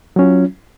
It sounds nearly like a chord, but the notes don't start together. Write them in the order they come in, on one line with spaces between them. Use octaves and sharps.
F#3 C#4 F4